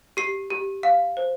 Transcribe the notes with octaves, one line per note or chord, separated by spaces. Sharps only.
G4 C7
G4
F5
C5